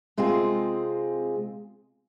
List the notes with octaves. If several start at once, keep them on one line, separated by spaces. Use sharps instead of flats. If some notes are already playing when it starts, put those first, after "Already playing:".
C3 G#3 C4 F4 G#4